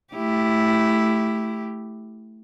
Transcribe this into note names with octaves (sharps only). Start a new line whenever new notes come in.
A3 E4 G4